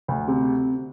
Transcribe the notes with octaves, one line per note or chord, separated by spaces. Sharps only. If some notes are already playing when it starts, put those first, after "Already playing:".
D2
C3